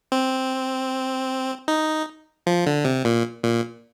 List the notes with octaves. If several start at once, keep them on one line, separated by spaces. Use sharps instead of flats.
C4
D#4
F3
D3
C3
A#2
A#2